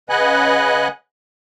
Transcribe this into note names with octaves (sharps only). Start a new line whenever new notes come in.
C#3 B4 D#5 F#5 G#5 F#6